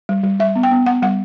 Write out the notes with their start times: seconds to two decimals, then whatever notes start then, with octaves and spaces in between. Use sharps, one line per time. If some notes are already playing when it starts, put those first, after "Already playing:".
0.09 G3
0.24 G3
0.40 G3 E5
0.56 B3
0.63 G5
0.71 B3
0.86 B3 F#5
1.02 G3 F#5